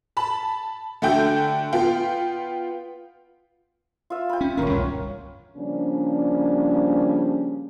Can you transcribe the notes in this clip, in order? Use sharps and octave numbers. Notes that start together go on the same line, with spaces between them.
A5 B5
D3 A3 F#4 G5 G6
B3 F4 G5
F4 E5
G5 B5
C#4
D1 D#2 C#4 A#4 C#5
C2 G2 B2
C#3 F3 G3 A#3 C#4 D4